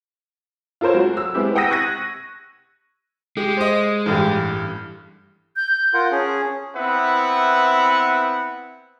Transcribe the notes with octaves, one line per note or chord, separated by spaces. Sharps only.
F4 A4 A#4 C5 C#5
F#3 G#3 F#4
E6
G#3 B3 C4 E4 G4
F#5 G5 D#6 E6 A#6 D#7
C#6 F#6 G#6 A#6 D#7
G#3 G4
C5 D#5
A1 G2 G4
G6
F4 A#4 F#5 C6
C#4 G#4 A5
B3 C4 E4 B4 E5 F#5